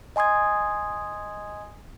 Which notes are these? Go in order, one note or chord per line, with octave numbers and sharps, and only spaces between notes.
D#5 G#5 C6 D#6 G#6